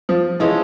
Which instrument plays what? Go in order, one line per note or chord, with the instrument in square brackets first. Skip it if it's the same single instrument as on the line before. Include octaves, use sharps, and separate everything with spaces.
[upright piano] F3
[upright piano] E3 [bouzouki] G#3 C#4 F4 A4